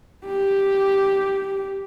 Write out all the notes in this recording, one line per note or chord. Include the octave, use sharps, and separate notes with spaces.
G4